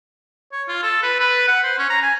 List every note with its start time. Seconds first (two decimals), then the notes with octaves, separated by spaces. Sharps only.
0.52 C#5
0.68 F4
0.83 A4
1.03 B4
1.20 B4
1.48 F#5
1.63 C5
1.78 C#4
1.90 A#5
2.03 G#5